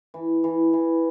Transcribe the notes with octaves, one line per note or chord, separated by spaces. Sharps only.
E3
E3
E3